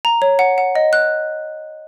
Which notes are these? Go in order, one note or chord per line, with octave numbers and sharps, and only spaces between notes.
A#5
C#5
F#5
F#5
D#5
F#6